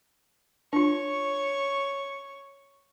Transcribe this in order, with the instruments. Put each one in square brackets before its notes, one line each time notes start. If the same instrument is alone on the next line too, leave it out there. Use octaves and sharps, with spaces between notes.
[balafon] D4 F4 [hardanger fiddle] C#5 C#6